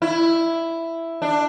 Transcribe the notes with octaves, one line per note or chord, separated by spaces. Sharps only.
E4
D4